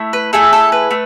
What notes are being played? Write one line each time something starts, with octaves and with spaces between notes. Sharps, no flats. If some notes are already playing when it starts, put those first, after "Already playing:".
Already playing: A3 E4
B4
A3 E4 G#4 A4
A4
B4
A3